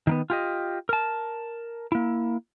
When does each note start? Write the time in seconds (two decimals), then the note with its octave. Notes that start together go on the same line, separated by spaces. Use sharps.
0.07 D#3 A#3 B3
0.30 F4 G4 D#5
0.89 A#4 A5
1.92 A#3 E4